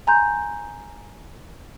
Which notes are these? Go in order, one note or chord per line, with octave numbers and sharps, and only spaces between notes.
G#5 A#5 C6 G6